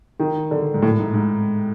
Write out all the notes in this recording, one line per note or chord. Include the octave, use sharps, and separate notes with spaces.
D#3
D3
G#2
A2
G#2
G#2